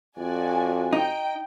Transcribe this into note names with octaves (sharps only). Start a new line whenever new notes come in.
F2 F#4 D5 G#5
D#4 G5